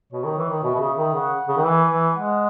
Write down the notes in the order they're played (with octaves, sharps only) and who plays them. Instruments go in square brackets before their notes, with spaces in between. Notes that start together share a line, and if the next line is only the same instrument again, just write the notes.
[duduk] B2 [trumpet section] C#5
[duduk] D#3
E3
D#3
[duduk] B2 [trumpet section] E5
[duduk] B2
C#3
D#3
[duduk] C#3 [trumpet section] F#5
[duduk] C#3
D#3
[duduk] E3 [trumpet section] G#5
[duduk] E3
[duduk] G#3 [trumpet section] F#5